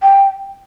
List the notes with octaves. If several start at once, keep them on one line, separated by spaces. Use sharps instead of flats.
G5